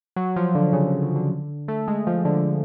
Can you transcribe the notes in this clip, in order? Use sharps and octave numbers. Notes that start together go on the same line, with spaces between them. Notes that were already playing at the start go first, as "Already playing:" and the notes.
F#3
F3
D3
C#3
D3
D3
D3
D3
A3
G#3
F3
D3